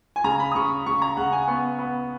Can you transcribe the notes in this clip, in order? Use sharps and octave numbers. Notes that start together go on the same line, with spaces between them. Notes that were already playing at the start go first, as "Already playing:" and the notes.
G#5
C#3 A#5
B5
D#6
C#3 C#6
C#3 C#6
A#5
C#3 F#5
G#5
B3 C#6
B3